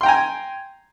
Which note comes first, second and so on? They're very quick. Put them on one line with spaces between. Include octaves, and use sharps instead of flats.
C6 G5 A#5 G#5